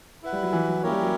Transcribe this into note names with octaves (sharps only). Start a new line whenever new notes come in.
E4 B4 F#5
G3
F#3
E3
F#3
A#3 C#4 E4 G4 A#4 C#5
G3
F#3